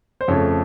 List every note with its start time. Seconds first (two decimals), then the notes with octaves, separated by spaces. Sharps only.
0.21 C5
0.28 F2 C#3 A3 C#5